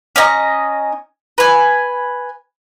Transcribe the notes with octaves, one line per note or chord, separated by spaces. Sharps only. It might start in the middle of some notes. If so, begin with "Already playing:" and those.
C#4 D#5 G5 A#5
B4 G#5